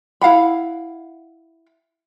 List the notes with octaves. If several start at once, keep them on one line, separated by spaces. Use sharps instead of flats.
E4 F5 F#5 B5